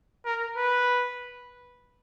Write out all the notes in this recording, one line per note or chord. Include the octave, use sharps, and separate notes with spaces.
A#4
B4